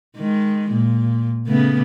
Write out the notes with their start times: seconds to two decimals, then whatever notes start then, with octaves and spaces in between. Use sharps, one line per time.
0.17 D#3 G#3
0.71 A#2
1.47 C#3 A3 B3